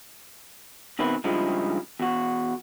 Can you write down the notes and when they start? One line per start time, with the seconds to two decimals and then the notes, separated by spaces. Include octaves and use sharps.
0.99 B2 D#3 C4 B4 E5
1.24 G2 C#3 F3 G#3 D#4 E4
2.00 E2 F#4